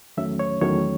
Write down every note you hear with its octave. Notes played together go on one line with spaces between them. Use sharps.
E2 D#3 F#3 A3 C#4 E5
C#5
E2 D#3 F#3 A3 C#4 C#5